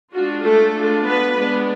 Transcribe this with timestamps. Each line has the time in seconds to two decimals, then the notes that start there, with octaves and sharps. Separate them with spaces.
0.14 G#3 D4 F4 F#4
0.45 A3 A4
0.75 G#3 D4 F4
1.04 B3 B4
1.35 G#3 B3 D4